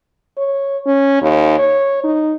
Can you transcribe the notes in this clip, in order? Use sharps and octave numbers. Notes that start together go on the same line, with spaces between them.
C#5
C#4
D#2
C#5
D#4